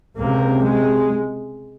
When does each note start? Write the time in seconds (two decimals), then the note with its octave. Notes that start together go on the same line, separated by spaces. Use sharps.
0.17 C#2 C3 A#3
0.64 G#3